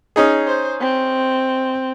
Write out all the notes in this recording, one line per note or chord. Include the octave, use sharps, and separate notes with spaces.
C#4 D#4 G#4
C5
C4